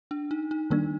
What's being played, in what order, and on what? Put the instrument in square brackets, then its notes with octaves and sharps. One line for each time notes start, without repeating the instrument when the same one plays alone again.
[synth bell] D4
D#4
D#4
[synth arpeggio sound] D#3 G3 A#3 D4 [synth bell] D#4